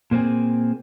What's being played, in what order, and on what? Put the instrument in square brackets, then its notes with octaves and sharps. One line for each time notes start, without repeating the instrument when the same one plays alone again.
[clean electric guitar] A#2 A#3 C4 G#4